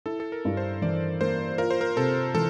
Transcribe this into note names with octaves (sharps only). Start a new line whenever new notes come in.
E4 A4
A4
A#4
G2
C5
E3 D5
A#3 C5
F4 A#4
C5
A#4
C3 A4
E3 A4